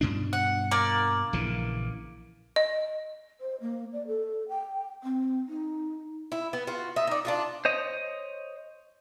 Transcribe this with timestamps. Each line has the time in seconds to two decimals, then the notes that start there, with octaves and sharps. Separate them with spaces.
0.01 G2 B2 D4
0.33 F#5
0.71 A#3 D5
1.33 A#1 C#3 E3
2.56 D#5
3.41 C5
3.61 A#3
3.93 D5
4.07 A4
4.49 G5
5.04 C4
5.48 D#4
6.32 E4
6.53 B3
6.67 F4 F#4
6.96 D#4 E5
7.07 D#4 D5
7.25 D4 F4 F#4
7.65 C5 C#5 D#5